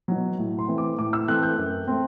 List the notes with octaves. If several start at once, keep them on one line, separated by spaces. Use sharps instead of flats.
B2 F#3
A2
C6
E3 A3 C4
D6
A2 D6
E6
E3 A3 C4 F#6
G6
F#2
A3 C4